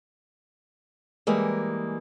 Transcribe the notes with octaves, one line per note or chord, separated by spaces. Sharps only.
E3 G3 G#3 A#3